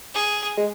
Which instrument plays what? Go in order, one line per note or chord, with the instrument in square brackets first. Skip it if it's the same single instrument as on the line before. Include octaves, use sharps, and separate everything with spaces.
[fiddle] G#4
[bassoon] G#3